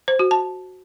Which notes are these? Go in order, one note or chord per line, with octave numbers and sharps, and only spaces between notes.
C5
F#4
A5